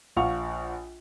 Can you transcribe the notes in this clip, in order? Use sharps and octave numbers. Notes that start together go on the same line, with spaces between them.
A#1 F4 F5 F#5 C#6 F7